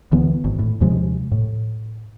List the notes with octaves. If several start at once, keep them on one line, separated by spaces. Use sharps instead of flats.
D2 E3 B3
G#1
A2
D#2 C3 F3 G#3
A2